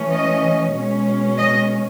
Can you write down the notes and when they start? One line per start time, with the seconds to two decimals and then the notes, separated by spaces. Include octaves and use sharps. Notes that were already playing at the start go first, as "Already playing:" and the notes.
Already playing: E3 A3 C#4
0.12 D#5
0.75 B2 G#3 C#4
1.38 D#5